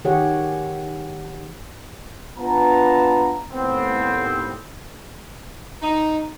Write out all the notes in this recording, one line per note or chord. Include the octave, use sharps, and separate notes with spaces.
D#3 G4 G#4 C#5 F#5
B3 D4 F4 B4 A5 A#5
D#2 A2 B3 C4
D#4